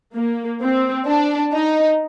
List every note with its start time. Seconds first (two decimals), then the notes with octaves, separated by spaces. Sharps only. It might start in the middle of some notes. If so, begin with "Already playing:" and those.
0.15 A#3
0.61 C4
1.06 D4
1.53 D#4